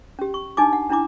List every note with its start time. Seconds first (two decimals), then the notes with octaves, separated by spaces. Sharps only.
0.19 C#4 G4
0.34 C#6
0.57 D4 D#4 G#5 D6
0.73 F#5
0.90 C#4 D4 E4 A#5 D6